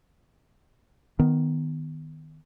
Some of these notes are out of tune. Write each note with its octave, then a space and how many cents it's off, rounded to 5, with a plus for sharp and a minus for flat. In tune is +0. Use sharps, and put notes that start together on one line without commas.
D#3 +0 B3 +10